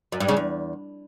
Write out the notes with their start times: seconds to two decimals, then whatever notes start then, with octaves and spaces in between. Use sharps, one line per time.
0.12 F#2
0.20 G2
0.28 C#3
0.37 E2